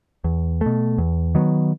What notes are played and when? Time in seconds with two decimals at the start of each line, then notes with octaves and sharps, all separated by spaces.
0.24 E2
0.61 B2 A3
0.98 E2
1.35 D#3 F#3 B3